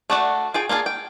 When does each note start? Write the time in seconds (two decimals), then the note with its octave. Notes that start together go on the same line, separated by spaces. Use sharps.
0.10 A3 D4 F#4 D5 F#5
0.54 F4 G#4 G5
0.69 A#3 D4 F4 G#4
0.86 G5